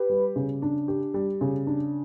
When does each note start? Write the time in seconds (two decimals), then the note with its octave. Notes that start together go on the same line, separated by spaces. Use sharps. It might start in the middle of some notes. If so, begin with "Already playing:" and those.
Already playing: G4 B4
0.10 G3
0.36 C#3
0.62 D4
0.88 G4
1.14 G3
1.41 C#3
1.67 D4